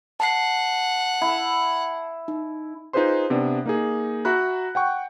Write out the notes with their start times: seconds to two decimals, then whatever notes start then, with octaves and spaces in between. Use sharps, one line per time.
0.20 F#5 A5 C7
1.22 E4
2.28 D#4
2.93 D#4 F4 G#4 B4 C5 C6
3.30 C3 B3 D4
3.66 A#3 D#4 G#4
4.25 F#4 E5 A#5 B5 F#6
4.75 F#5 G5 C#6